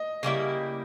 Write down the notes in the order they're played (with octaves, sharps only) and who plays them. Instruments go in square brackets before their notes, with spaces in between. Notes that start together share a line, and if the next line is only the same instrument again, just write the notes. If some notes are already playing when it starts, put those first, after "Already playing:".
Already playing: [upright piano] D#5
[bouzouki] C#3 G3 A#3 E4